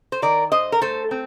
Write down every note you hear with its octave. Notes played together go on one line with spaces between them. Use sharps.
C5
D#3 A#4 D5
G2 C5 D#5
A#4
A3 A4 C5
C4